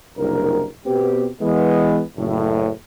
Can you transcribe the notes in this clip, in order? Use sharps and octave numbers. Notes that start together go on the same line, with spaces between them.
F#1 C2 D4 A#4
B2 B3 C4 G4
E3 G#3 B3
F#1 A2